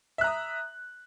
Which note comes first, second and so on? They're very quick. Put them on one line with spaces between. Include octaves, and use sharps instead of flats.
E5 F#6 A#5 D#6